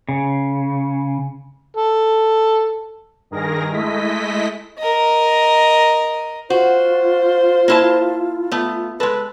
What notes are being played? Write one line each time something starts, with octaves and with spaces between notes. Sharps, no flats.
C#3
A4
G2 D#3 G#4 A#4 A#6
G#3 A3 E4 D#5 B6
A#4 D#5
F4 F#4 C5
A#3 E4 A5
A3 B3
G#3 A4 B4